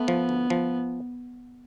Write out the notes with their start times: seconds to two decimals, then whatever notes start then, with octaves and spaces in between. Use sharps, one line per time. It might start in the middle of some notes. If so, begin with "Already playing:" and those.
Already playing: A3 B3
0.08 F3
0.29 D2
0.50 F3